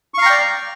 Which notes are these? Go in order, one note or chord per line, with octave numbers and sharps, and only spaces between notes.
D5 F5 G5 A#5 C#6